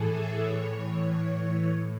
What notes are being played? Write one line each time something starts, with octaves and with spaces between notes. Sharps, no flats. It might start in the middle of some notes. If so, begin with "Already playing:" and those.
Already playing: A2 E3 G#4 A4
E5
A2 E3 C#5
C#5
A2